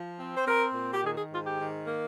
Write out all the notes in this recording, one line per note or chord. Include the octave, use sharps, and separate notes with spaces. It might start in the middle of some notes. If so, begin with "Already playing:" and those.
Already playing: F3
C4
C5
C4 A#4
A#2
G4
D#3 G#4
G#4
G#2 F4
G4
D#3
A#3